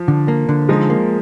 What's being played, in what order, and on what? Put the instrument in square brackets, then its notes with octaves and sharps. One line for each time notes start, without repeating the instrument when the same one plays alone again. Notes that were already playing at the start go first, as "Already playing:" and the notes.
Already playing: [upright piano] F3
[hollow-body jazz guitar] D3
A#3
D3
[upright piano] F3 G#3 [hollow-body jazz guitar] D#4
[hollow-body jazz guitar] A#3